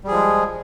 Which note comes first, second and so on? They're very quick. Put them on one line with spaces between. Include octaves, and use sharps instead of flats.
G3 G#4 F3 G#3